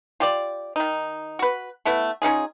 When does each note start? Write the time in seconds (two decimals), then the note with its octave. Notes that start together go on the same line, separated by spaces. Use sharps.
0.20 F4 G4 D5
0.76 D#3 D#4
1.39 F#4 B4
1.85 A3 B3 E4 A4
2.22 C#4 D#4 F4 G#4